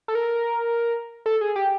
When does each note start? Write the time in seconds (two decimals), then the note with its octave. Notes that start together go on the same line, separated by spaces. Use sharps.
0.08 A4
0.15 A#4
1.26 A4
1.41 G#4
1.56 G4